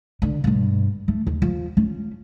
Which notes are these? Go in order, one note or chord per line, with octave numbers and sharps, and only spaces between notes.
D3
G2 B2
A3
D#2
F3
C#4